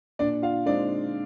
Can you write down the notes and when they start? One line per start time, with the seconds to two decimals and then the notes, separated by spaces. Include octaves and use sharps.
0.19 A#2 D4 D5
0.42 F4 F5
0.66 G#3 C4 D4 D#4 D5